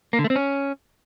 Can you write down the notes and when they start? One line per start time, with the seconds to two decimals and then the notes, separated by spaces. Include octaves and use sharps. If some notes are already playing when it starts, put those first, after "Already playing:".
0.13 A#3
0.19 D3
0.24 A3
0.30 C4
0.36 C#4